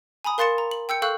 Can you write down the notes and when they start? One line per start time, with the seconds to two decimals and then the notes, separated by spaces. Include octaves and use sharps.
0.24 G#5 A#5 B5 D#6
0.38 A#4 F5 C6 A6 C#7 E7
0.58 A#5
0.71 F#7
0.89 G5 E6 G6 C#7
1.02 A4 F5 C#6 E6 F#6 G6